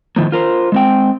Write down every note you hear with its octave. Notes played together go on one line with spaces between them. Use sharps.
A2 D#3 F3 A#3
F4 A#4 C5
G#3 C4 G5